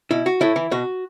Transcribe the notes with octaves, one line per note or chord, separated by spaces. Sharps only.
B2 E4
F#4
A2 E4
E3
B2 F#4